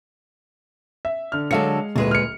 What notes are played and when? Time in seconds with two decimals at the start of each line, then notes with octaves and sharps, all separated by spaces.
1.05 E5
1.32 D3 F6
1.51 D3 F#3 G#3 A4 F5 C#7
1.96 D1 A#2 G#3 B4
2.11 F6 C#7